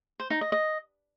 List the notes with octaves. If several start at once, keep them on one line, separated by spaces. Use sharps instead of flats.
C5
D#4
D#5
D#5